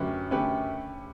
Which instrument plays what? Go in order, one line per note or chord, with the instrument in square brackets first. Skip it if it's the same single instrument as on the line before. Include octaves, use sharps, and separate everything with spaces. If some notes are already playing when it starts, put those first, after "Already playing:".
Already playing: [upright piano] F#2 [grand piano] D3 A3 C#4 G4 B4
[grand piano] D3 A3 C#4 G4 B4